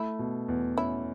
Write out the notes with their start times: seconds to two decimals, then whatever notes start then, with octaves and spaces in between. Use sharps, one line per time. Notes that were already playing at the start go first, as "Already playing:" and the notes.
Already playing: A3 E4
0.19 B2
0.48 E2
0.77 C#4 E4